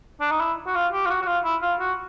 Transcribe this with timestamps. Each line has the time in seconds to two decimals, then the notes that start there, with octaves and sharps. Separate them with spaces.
0.20 D4
0.31 D#4
0.40 E4
0.67 F#4
0.75 F4
0.92 G4
1.06 F4
1.10 F#4
1.22 F#4
1.26 F4
1.44 E4
1.62 F4
1.80 F#4